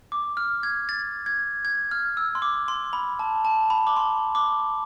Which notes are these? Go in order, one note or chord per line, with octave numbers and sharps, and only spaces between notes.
D6
F6
G#6
A6
G#6
G#6
F6
E6
C6
D6
C6
B5
A5
A5
B5
D6
C6
D6